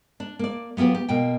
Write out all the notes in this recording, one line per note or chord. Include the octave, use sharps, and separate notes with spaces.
D4
A#3 D5
F#3 B3 F4 G4 B4
G4
B2 A#3 G5